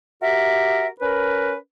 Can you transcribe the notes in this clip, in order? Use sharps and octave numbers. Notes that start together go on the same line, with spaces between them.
F#4 G4 A#4 E5
C#4 A#4 B4